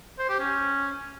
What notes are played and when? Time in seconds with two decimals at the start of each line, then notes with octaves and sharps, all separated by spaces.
0.19 C5
0.29 G4
0.40 C#4